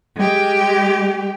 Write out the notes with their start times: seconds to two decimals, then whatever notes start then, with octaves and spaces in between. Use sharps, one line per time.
0.17 G#3 G4